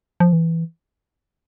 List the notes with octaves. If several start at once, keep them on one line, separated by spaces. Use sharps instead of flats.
F3
E3